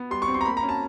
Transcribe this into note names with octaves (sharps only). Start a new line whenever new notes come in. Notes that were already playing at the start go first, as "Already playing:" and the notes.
Already playing: B3
G3 C6
C#6
C4
C6
A#5
A#3 B5
A#5
C#4
A5